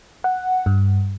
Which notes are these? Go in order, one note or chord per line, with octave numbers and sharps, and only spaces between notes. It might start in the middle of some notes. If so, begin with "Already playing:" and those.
F#5
G2